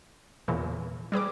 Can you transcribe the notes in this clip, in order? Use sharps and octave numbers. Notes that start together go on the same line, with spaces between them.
E2 A#2 C#3 E3
G3 G#4 B4 D6